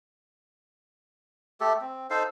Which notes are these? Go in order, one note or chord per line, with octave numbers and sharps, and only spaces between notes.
A3 G4 A4
C4
D#4 A4 C5 F5